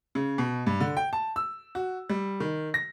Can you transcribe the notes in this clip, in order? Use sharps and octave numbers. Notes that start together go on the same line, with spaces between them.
C#3
B2
G2
D3
G5
A5
E6
F#4
G3
D#3
A#6